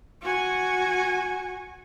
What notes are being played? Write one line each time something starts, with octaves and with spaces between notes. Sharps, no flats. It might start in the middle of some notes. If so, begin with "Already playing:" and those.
F#4 G#5